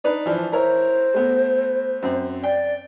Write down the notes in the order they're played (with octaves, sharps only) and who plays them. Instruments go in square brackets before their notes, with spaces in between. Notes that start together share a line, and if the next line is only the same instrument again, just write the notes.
[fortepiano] D4 D#4 B4
E3 F3 D4
[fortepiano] E4 A#4 C#5 [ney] C5
[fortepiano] A3 B3
F#2 C4
[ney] D5 [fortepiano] G5